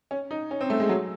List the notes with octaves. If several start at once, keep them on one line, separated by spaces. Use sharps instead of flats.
C#4
D#4
C#4
C4
A3
G#3
F#3